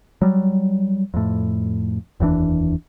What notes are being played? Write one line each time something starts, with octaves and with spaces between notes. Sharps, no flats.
F#3 G3
F2 A2
F1 D#2 E3 D4